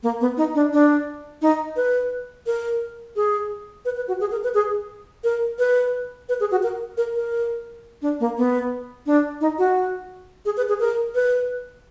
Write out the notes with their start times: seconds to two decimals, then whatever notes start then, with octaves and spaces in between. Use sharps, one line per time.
0.03 A#3
0.21 B3
0.37 D#4
0.55 D4
0.73 D4
1.42 D#4
1.76 B4
2.46 A#4
3.16 G#4
3.85 B4
3.96 B4
4.08 F#4
4.20 G#4
4.31 A#4
4.43 B4
4.54 G#4
5.24 A#4
5.59 B4
6.29 B4
6.40 G#4
6.51 F#4
6.63 A#4
6.97 A#4
7.15 A#4
8.02 D4
8.20 A#3
8.37 B3
9.06 D4
9.41 D#4
9.58 F#4
10.45 G#4
10.57 B4
10.69 G#4
10.80 A#4
11.15 B4